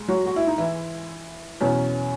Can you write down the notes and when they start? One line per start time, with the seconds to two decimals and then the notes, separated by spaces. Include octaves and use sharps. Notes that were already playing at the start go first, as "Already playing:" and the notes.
Already playing: G#2
0.08 F#3 F#4
0.26 F#4
0.36 E4
0.47 D#4
0.58 E3 E4
1.60 E2 B2 F#3 C#4